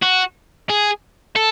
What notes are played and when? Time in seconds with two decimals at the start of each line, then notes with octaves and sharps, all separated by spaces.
0.03 F#4
0.69 G#4
1.36 A4